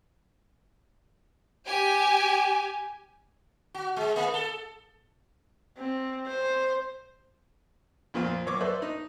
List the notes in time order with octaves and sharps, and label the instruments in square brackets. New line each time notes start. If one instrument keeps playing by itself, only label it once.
[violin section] G4 G#5
[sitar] F#4
G#3
A#3
A4
[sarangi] C4
C5
[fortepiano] F2 A#2 C4 F4
F#2 C#5 D6
A4 B4 C5 D5 E5
D#4